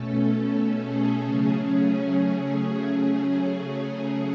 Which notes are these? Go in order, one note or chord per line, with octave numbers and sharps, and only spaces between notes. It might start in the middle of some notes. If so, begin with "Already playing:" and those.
Already playing: B2 A3 C#4 A4
A4
G#4
C#3 F#3 A3 C#4